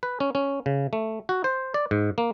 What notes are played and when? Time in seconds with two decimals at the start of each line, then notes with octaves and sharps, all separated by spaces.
0.03 B4
0.20 C#4
0.35 C#4
0.66 C#3
0.93 A3
1.29 F#4
1.44 C5
1.74 D5
1.91 G#2
2.18 A#3